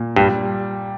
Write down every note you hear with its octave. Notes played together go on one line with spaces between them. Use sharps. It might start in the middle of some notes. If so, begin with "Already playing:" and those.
Already playing: A#2
G2 G3